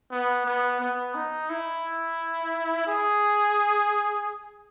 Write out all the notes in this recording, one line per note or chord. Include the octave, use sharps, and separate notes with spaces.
B3
B3
B3
D#4
E4
G#4